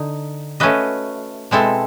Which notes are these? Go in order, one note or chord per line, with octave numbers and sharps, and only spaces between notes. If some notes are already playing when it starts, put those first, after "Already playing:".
Already playing: D3 D#4
A3 C#4 F#4 B4 D#5
B2 G#3 C4 E4 A4